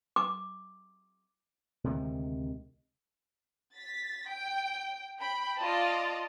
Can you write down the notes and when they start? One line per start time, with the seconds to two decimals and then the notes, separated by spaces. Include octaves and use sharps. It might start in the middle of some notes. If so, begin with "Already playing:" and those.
0.16 D6
1.84 D2 C3 D#3 G#3
3.74 A6 B6
4.27 G5
5.20 G5 B5
5.59 F4 D5 D#5 A5